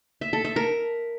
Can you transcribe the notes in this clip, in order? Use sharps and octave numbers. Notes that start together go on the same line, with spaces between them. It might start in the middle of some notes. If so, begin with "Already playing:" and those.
E5
A4
E5
A#4